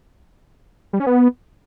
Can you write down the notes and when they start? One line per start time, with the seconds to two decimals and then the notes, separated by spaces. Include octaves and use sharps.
0.93 G3
1.00 C#4
1.07 B3